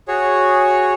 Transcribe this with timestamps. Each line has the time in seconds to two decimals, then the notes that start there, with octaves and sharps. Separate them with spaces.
0.08 F#4 G#4 C#5